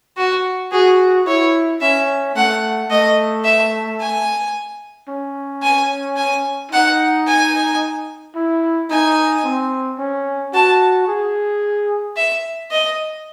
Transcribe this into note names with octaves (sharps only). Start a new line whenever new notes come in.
F#4
F#4 G#4
E4 C#5
C#4 E5
A3 F#5
A3 D#5
E5
G#5
C#4
G#5
G#5
D#4 F#5
G#5
E4
D#4 G#5
C4
C#4
F#4 A5
G#4
E5
D#5